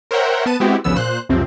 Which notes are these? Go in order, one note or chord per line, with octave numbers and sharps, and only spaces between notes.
A#4 C5 C#5 E5 F#5 G5
B3 A5 D#7
G#3 B3 C4 E4 F#4 G4
G#1 D2 C#3 F3 B3 E6
A#2 C5 F#6
C#2 F#2 C3 F3 C4